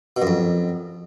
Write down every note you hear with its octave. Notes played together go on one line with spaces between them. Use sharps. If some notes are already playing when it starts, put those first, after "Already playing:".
B2
F#2
F2